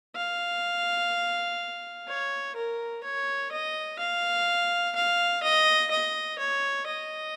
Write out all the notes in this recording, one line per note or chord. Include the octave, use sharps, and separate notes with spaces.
F5
C#5
A#4
C#5
D#5
F5
F5
D#5
D#5
C#5
D#5